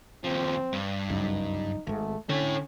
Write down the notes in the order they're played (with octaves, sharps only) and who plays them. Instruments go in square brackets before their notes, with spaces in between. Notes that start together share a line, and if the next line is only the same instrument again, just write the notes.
[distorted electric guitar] D#2 F3 [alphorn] C4
[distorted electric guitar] G2
[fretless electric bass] G1 C#2 F#2 [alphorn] D#4
[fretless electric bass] G#1 G#2 [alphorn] A3
[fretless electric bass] D3 [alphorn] C#4 [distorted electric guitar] E4 C#5